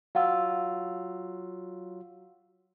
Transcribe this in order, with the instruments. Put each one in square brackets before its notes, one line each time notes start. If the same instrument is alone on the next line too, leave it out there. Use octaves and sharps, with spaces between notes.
[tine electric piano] F#3 F4 [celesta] F5 F#5 E6